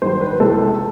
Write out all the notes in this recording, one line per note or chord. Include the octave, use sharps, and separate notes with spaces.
G2 D#3 F#3 C5
B4
C#2 C3 E3 A3 A4